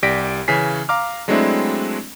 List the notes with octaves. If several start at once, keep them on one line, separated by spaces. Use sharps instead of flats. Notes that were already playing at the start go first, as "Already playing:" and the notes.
C2 G4 D5 A#6 B6 D7
C#3 E3 C#4 G#5 B6 C7
F5 A#5 D6 F6
F#3 G#3 A3 C4 D4 E4